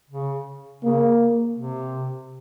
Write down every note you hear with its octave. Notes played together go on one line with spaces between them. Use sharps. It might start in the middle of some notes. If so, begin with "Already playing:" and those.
C#3
C#3 A#3
C3